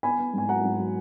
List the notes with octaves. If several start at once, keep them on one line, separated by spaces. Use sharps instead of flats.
B3 G#5 B5
B3
G#2 G#5
F#3 F#5 A#5
G#2
F#3